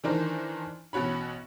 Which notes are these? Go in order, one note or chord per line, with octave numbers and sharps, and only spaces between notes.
D#3 E3 D4 A#4 C5
A1 B2 F#4 C#5 B5